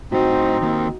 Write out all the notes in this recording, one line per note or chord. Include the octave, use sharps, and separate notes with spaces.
A2 C4 D#4 F#4 C5
D#3 A#3